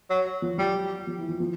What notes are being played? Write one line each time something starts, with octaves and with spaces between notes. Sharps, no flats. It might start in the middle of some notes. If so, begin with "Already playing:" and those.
F#3
F3
F#3 G3
F3
E3
F3
F3